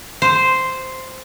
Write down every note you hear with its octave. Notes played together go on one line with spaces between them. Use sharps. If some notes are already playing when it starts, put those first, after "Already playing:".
C5